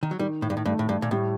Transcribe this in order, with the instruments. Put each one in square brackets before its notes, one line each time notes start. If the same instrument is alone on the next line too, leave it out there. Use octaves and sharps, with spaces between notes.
[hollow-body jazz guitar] D#3
F#3
[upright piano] D#3 [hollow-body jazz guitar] G3
[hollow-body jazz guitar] A2
G2
A2
[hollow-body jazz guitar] G2 [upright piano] A3
[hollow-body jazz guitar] A2
G2
A#2
[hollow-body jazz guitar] A2 [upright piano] G3